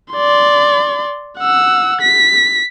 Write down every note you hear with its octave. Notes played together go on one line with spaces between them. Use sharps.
D5 C6
F#5 E6
B6